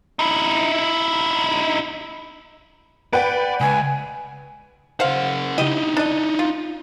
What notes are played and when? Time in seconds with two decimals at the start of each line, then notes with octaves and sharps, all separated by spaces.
0.19 D#4 E4
3.13 B4 D5 F#5 G5
3.61 C#2 G#5
5.00 C#3 C5 F5 F#5
5.58 D#4 E4 G4 D#5
5.97 D4 D#5
6.39 F4